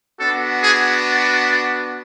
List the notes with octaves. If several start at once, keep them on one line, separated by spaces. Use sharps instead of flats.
B3 D4 F#4 A4
G#4